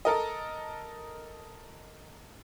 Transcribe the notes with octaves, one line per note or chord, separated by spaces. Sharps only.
A4 A#4 D#5